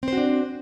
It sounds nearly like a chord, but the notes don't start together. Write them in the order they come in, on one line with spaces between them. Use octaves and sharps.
C4 C5 F#4 D4